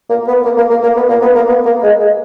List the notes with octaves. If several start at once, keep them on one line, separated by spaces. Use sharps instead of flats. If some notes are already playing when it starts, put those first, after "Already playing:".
A#3
B3
A#3
A#3
A#3
A#3
B3
A#3
B3
A#3
B3
A#3
G#3
G#3